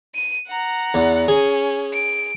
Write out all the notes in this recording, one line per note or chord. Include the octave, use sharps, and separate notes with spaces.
D#7
F#5 A#5
E2
C#4 G#4
D7